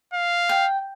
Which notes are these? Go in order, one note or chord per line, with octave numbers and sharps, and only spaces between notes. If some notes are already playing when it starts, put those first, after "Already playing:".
F5
G5